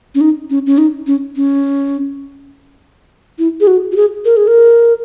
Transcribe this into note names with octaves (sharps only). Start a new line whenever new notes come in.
C#4
D#4
C#4
C#4
D#4
C#4
C#4
E4
G#4
F#4
F#4
G#4
A#4
G#4
A#4